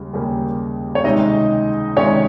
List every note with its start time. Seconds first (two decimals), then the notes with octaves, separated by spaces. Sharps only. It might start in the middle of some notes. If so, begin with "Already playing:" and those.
Already playing: D#2 C#3 G3
0.13 D#2 C#3 G3 A#3
0.95 C#5
1.04 C#2 C3 D#3 G#3 D#4 D#5
1.96 C#2 C3 D#3 G#3 C#4 C#5